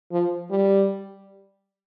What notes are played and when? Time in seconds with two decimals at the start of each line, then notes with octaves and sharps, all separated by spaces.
0.12 F3
0.51 G3